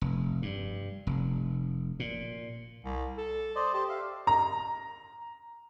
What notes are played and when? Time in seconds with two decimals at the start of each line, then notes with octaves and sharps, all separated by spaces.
0.01 F1
0.42 G2
1.07 F1
2.00 A#2
2.85 C2
3.18 A4
3.56 C5 D5 D#5
3.74 G4 C5 A5
3.89 E5 F5
4.27 A#5